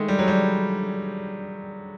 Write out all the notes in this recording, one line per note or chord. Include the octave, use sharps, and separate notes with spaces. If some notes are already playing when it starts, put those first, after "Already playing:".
Already playing: D#3 G#3 A3
G3
F#3
G3